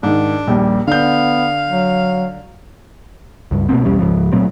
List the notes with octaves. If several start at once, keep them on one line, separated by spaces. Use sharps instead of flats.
G#2 D#3 D4
A#1 D#2 G3
D3 B3 F5 G6
F#3
C#2 G2
B2 A3 A#3 C4
B1 E2 G3 C#4
C#2 G#2 F3
A#2 F#3 A3 C4